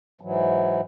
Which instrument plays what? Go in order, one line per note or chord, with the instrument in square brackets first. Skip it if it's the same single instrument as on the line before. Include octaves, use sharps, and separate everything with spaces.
[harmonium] G#2 E3 F#3